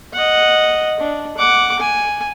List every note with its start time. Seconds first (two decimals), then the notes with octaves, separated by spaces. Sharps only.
0.13 D#5 F#5
1.00 D4
1.38 F#5 D6
1.80 G#5